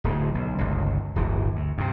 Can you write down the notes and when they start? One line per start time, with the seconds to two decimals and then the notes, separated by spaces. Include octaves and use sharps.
0.04 D1 D2 G#2
0.34 B1
0.58 G1 C#2
1.16 D1 G1 E3
1.56 D2
1.78 G2 C3